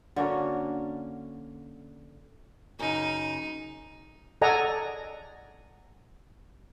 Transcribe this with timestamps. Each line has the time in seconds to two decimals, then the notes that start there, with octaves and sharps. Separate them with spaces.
0.16 D3 A#3 C#4 F#4
2.79 F#2 C#3 D#4
4.42 A4 D5 D#5 F#5 G#5 A#5